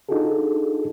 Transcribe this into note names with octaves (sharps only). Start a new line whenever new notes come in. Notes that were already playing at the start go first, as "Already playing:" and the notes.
D4 D#4 F4 F#4 G#4 A4